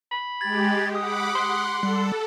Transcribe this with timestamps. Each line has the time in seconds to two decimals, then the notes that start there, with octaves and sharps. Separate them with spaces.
0.12 B5
0.41 G#3 G4 G#6 A6
0.95 F#5 B5 D6 D#6
1.35 F#5 C6
1.83 G3 A4